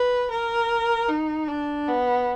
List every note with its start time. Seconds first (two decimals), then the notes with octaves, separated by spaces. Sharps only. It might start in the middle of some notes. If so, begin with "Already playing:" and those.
Already playing: B4
0.31 A#4
1.08 D#4
1.48 D4
1.88 B3